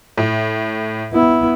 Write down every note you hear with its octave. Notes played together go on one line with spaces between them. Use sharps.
A2
B3 E4